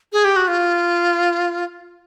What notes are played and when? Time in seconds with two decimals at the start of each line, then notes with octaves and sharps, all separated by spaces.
0.13 G#4
0.25 G4
0.36 F#4
0.48 F4